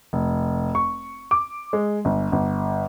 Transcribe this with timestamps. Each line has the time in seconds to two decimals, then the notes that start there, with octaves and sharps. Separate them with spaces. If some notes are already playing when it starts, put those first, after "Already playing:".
0.13 F1
0.75 C#6
1.31 D6
1.73 G#3
2.05 G1
2.32 G1